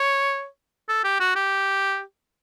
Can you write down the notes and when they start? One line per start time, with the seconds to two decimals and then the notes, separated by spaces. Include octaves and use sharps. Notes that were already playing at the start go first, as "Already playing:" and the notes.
Already playing: C#5
0.89 A4
1.04 G4
1.20 F#4
1.36 G4